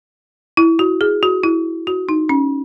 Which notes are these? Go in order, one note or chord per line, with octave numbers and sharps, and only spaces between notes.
E4
F#4
G#4
F#4
E4
F#4
D#4
C#4